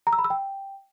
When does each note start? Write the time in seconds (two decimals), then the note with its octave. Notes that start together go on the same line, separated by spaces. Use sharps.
0.07 A#5
0.13 E6
0.19 B5
0.24 E6
0.30 G5